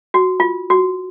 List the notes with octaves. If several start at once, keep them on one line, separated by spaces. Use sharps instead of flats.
F#4
F4
F#4